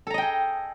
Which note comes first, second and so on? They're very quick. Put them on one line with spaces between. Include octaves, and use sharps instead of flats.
A4 A#5 D#5 G5 G#4